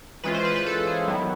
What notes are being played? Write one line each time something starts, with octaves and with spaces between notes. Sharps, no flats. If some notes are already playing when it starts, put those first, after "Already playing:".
E3 G#3 C#4 F4 B4
C5
B4
B4
A4
G#4
D#3 F#3 B3 E4